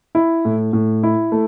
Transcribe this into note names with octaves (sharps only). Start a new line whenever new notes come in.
E4
A2
A2
E4
A3